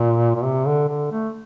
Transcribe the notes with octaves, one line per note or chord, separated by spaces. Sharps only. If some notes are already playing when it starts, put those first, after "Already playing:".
Already playing: A#2
A#2
C3
D3
D3
A3